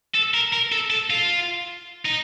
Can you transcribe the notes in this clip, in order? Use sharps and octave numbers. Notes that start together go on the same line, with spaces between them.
A4
A#4
A#4
A4
A4
F4
D#4